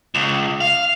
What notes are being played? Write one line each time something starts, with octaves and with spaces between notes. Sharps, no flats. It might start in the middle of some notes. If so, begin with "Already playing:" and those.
C#2
F5